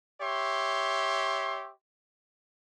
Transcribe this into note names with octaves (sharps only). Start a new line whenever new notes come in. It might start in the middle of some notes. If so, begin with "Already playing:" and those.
G4 C#5 E5 C6